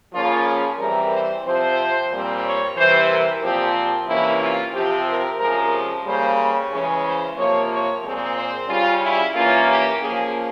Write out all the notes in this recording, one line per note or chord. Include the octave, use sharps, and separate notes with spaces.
C#3 F3 A#3 C#4 F4
G#4
E3 G3 C4 A#4
C5
C3 F3 C4 C5
A#2 G3 C4
C#5
C3 E3 G3 C5
A#4
A#2 F3 C4 G4
C3 E3 A#3 C#4 E4
F4
C3 F3 C4 G4
A#4
C3 F3 G#3 C#4 A#4
C5
C#3 G3 A#3 C5
C#5
C#3 E3 G#3 C#4
C5
C3 F3 A#3 C#5
C#5
A#2 G#3 C4
C5
C#3 G3 C#4 F4
E4
E3 A#3 C#4 F4
G4
F3 A#3 C#4 G#4